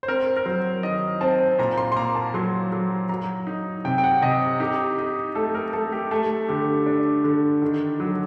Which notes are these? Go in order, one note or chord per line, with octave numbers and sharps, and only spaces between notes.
C5
C4 A#4
A#4
F#3 C5
D#3 D#5
C4 A5
A#2 A#5
C6
C6
A#3 A#5
A5
F#3 C6
F#3
F#3 A#5
D#4
C3 G5
G5
F#5
C3 D#5
D#4 G4
D#4
A3 A4
A#4
A3 A4
G4
A3 A4
D3 G4
D4
D3
D#3
F#3